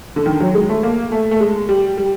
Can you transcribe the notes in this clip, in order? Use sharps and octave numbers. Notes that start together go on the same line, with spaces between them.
D3
D#3
F#3
G#3
A3
A#3
A3
A3
G#3
G3
G3